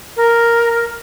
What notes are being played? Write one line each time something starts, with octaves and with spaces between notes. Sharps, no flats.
A#4